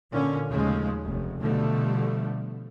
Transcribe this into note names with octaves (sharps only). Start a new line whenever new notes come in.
A#2 D3 C#4
D#2 C#3 F3 G#3 A3
F1
B2 D3 F3 G3 A3